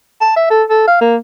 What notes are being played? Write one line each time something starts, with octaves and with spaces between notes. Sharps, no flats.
A5
E5
A4
A4
F5
A#3